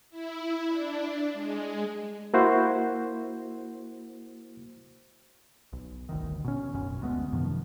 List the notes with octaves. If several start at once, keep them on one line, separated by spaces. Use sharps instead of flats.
E4
D4
G#3
A#3 E4 F#4 C5
B1
G1 D2 D#3
B2 C#4
D#1 G#1 F#2 C#4
D2 G#3 B3
F#2 C3 D#3 F3